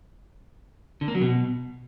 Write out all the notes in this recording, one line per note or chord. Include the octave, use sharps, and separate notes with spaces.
D3
A#3
F#3
B2